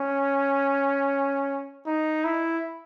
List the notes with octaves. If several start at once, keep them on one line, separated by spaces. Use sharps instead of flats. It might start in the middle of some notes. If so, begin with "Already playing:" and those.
Already playing: C#4
D#4
E4